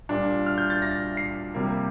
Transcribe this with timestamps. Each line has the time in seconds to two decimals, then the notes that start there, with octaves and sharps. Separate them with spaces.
0.09 A#2 G3 D4
0.46 F6
0.58 G6
0.70 A6
0.82 A#6
1.17 C7
1.54 C3 G3 A#3